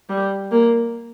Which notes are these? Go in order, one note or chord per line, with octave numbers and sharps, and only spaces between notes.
G3
A#3